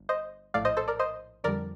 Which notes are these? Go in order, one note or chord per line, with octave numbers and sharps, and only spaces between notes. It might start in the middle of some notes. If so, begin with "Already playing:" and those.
Already playing: G1
C5 D#5
A#1 A2 A3 D5 F5
C5 D#5
A4 C5
A#4 D5
C5 D#5
F2 D3 G3 A#4 D5